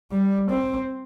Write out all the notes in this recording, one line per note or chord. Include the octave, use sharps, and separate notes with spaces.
G3
C4